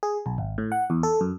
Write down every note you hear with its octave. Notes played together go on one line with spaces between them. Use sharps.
G#4
B1
G#1
A2
F#5
E2
A4
F#2